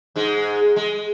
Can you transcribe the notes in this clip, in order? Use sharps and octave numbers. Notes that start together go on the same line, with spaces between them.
G#2 G#3
G#3